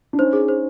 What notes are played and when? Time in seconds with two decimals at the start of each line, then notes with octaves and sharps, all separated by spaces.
0.13 D4
0.19 C#4 D#4 C5
0.33 G#4
0.48 C5